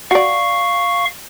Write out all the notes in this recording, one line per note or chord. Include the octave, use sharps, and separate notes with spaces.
F#4 D5 F5 C#6